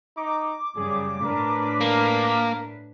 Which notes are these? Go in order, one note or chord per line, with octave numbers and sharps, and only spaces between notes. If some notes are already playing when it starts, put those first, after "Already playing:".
D#4 D6
F#2 C#3 G3 G#4
A2 D4 A#4 B4
A#3 A#4